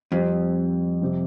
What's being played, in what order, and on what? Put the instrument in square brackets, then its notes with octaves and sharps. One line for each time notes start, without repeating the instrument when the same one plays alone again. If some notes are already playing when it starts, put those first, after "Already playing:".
[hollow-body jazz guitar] F2 [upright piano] G3 C4 G4
[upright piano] C3 G3 C4 G4